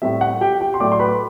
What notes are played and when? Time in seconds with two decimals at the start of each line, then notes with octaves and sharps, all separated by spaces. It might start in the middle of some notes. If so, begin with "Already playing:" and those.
0.02 A2 G3 C4 E5
0.21 F#5
0.41 G4 G5
0.60 G4 G5
0.74 C6
0.80 A2 F#3 A3 D5 D6
0.92 C6
0.99 B4 B5